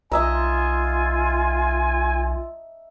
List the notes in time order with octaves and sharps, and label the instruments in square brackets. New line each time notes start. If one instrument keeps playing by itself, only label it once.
[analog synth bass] B1 [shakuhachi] F4 [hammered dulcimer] D#5 E5 A#5 [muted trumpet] G#5